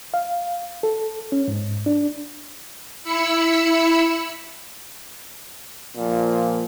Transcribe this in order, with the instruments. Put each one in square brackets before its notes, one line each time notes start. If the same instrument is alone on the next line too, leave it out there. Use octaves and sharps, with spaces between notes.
[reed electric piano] F5
A4
C#4
G#2
D4
[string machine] E4 B5 E6 C#7
[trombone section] A#2 F3